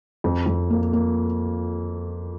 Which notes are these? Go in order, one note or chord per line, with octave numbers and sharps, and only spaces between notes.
F2
F2
A#3
A#3